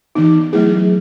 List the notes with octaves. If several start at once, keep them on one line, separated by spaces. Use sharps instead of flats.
E3 B3 D#4
F#3 A3 E4 G#4